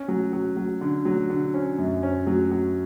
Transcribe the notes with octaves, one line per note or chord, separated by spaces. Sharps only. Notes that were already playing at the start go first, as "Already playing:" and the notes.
Already playing: C#4
F#3
F#3
F#3
D3
F#3
D3
C#4
F#2
C#4
F#3
F#3